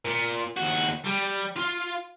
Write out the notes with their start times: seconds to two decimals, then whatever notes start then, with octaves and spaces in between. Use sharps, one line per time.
0.05 A#2
0.57 D#2 F#4
1.04 G3
1.57 F4 F5